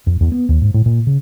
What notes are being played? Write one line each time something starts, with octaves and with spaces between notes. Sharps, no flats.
F2
E2
B3
D#2
G#2
A2
A#2
C#3